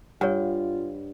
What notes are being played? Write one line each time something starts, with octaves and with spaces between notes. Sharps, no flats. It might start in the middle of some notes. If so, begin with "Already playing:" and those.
G2 F4 C#5 F#5